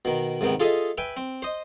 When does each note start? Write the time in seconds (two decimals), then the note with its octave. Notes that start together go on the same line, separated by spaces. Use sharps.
0.05 B2 D#3
0.41 G#2 C3 D#3 B3
0.60 F4 G#4 A4 D#5 E5
0.98 B4 E5 G5 G#5
1.17 C4
1.42 C5 D#5